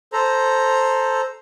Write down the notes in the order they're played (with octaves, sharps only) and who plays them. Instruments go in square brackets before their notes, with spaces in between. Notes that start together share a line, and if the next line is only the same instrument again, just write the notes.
[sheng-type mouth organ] A4 C5 A#5